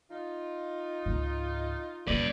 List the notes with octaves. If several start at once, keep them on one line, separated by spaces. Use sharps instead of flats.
D#4 F4
C#2 G#2
D#1 C#3 B4 D5